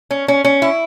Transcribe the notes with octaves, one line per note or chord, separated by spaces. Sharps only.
C#4
C#4
C#4
E4